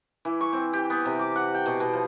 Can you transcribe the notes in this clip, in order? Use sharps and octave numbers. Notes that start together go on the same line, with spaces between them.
E3
C#6
C4
G4
B3
C3
D6
F#5
G5
B2
B2
F3